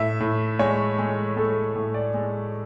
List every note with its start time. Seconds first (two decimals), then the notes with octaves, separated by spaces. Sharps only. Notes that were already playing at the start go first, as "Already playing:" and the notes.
Already playing: A2 E5
0.20 A2
0.59 G#3 C#5
0.98 G#3
1.37 G#3 A4
1.76 A2
1.94 D5
2.14 G#3